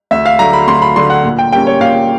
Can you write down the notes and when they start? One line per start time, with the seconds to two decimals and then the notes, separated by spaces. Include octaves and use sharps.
0.11 D2 E5
0.26 F5
0.39 D3 F#3 A3 D4 A#5
0.53 B5
0.68 D2 C6
0.82 B5
0.96 D3 F#3 A3 D4 C6
1.10 F#5
1.24 A#2
1.39 G5
1.53 G3 A#3 C#4 G5
1.67 C#5
1.81 A#2 F5